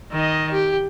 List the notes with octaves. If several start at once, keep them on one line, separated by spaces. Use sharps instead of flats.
D#3 D#5
G4